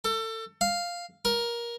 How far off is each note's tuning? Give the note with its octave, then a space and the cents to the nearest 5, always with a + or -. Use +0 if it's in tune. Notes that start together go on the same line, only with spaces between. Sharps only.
A4 +30
F5 +0
A#4 +15